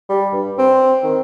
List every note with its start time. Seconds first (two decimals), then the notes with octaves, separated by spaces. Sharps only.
0.09 G3
0.33 G2
0.58 C4
1.03 D#3